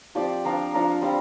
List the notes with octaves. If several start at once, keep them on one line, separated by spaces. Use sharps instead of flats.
F3 C4 G4 D5
F3 D4 A#4 F5
F3 D4 A#4 F5
G3 C4 F4 C5